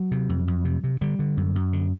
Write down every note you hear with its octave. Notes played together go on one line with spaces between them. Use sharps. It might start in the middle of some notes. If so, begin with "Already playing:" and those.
Already playing: F#3
C3
F2
F2
C3
C3
D3 G3
D3
F#2
F#2
D3